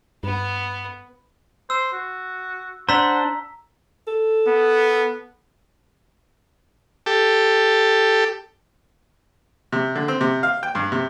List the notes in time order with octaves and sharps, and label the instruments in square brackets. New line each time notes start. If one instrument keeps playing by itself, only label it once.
[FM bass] G2 [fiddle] B3
[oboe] C5 [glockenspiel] E6
[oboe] F#4
[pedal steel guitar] D4 C5 [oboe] F#5 [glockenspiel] A#5 E6 B6
[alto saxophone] A4
[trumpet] B3
[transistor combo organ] G4 A4
[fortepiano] C3
D3
C4
C3
F5
G5
G2
C3